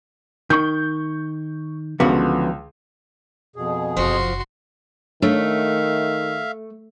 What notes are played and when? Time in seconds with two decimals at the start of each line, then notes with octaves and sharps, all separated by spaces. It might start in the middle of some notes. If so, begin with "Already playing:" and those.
0.50 D#3 C#6 G6
2.00 C#2 D3 E3 F3 B3 F#4
3.56 F2 B2 G#4
3.97 F#1 C3 F3 F#4 C6
5.22 D#3 A3 D4 C#5 E5 F5